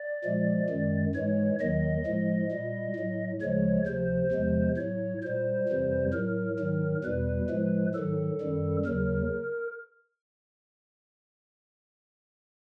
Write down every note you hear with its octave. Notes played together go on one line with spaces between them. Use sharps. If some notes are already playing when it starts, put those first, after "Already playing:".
Already playing: D5
A#2 F3 G#3
F#2 D#3 G#3
G#2 E3 G#3 C#5
D#2 D#3 F#3 D#5
A2 F3 G#3
A#2 G3
A2 F#3
D2 C#3 F3 G#3 C#5
D2 C3 F3 C5
E2 C3 F3 G#3
A2 F#3 C#5
A#2 G3 C5
F2 C3 E3 G3
A2 F#3 A#4
G#2 D#3 F#3
E2 B2 G3 B4
A2 F3 G#3
G#2 D#3 F#3 A4
F#2 D#3 G3
D#2 C#3 F#3 A#4